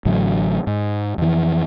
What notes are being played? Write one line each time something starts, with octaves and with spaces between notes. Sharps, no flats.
A1 A2 D3 F#3
G#2
F2 E3